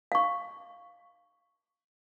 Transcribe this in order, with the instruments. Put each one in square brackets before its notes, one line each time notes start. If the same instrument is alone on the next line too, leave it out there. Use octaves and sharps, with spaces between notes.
[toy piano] F5 C#6